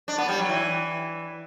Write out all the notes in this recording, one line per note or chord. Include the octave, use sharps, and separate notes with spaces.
D4
B3
G3
F#3
E3